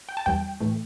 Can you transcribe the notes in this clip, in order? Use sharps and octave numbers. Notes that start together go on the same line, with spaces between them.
G5
A5
E2 E3 G3 G5
A2 E3 A3